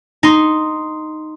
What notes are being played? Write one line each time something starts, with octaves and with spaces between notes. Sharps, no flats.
D#4 C6